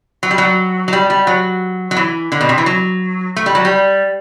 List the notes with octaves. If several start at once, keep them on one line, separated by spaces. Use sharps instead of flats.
F#3
G3
F#3
F#3
G3
G3
F#3
F#3
E3
D3
B2
C3
E3
F#3
A3
G3
F#3
G3